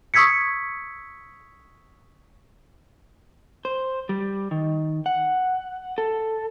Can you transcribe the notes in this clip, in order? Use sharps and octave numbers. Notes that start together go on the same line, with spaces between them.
C#6 D#6 E6 G#6 B6 C#7
C5
G3
D#3
F#5
A4